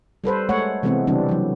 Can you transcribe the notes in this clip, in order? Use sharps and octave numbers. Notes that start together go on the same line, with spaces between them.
G3 A4 B4 C5
G#3 A3 C#5 F#5
C3 E3 G#3 A3 B3 C4
C#3 E3 G3 C4 D4
E3 F#3